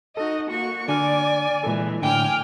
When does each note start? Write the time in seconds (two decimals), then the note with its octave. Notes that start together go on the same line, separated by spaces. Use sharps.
0.17 D#4 F#4 A4 D#5
0.49 A#3 F#4 C#6
0.88 D3 D4 D5 G#5 F6
1.63 A#2 E3 G#3 A4
2.03 A2 D3 G5 G#5 D6 F6